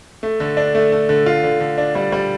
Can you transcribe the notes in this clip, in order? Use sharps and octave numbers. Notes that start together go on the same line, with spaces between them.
A3
D3
D4
A3
A3
D3
F4
D3
D3
D4
G3
G3